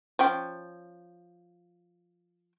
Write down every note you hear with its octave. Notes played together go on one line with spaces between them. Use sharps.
F3 C#4 G5